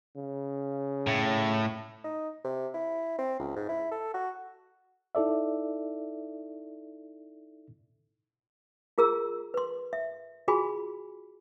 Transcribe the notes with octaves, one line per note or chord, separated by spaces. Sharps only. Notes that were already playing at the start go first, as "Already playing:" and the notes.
C#3
A2
D#4
C3
E4
C4
C#2
G#2
E4
A4
F#4
D#4 E4 A4 D5 E5
F4 G#4 A#4 A#5 E6
B4 C6
E5
F4 F#4 G#4 G#5 B5 C6